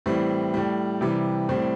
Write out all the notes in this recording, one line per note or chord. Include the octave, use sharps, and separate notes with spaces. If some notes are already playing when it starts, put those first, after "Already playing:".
A2 E3 G3 C4
A2 G3
C3 E3 G3
A2 G3 C4